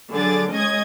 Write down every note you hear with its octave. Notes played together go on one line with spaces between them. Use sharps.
D3 F#3 G#4 D6 A6
G#3 C#4 D#5 D#6 G#6